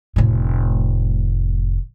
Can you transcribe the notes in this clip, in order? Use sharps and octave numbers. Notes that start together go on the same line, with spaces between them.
F1 A2